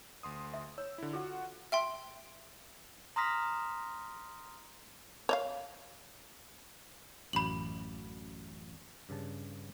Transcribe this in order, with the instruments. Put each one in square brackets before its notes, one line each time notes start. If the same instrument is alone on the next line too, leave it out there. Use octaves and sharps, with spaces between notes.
[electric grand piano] D2 C6 D#6
[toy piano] E5
[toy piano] C#5 [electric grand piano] E6
[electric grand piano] D3 E4
[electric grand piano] F4 F#4 F#5 [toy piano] A4
[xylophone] E5 G5 C6
[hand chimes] A#5 C6 D#6 F6 A#6 B6
[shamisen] C#5 D#5 F5
[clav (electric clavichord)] A1 F#2 [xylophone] B5 F#7
[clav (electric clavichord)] G2 C#3 A5